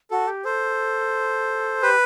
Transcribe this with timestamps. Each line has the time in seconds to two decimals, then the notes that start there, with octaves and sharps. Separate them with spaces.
0.11 F#4 A4
0.28 G4
0.45 A4 C5
1.82 G4 B4